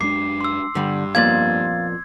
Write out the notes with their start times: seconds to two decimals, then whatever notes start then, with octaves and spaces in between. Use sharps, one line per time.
0.01 F#2 G#3 D4 D6 C7
0.41 C6 E6
0.75 G2 D3 G3
1.15 F2 A#2 B3 F5 G#6 A6